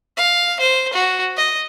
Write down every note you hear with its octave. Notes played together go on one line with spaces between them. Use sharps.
F5
C5
F#4
D#5